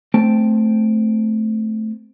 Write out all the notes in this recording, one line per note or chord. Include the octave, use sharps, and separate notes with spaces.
A3 C4 C5 G5 A5